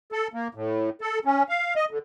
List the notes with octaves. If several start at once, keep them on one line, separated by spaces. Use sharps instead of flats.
A4
A#3
A2
A4
C#4
F5
D#5
D3